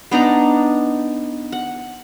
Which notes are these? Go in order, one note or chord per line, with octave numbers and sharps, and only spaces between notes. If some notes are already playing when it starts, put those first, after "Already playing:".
B3 D4 D#4 A#5
F#5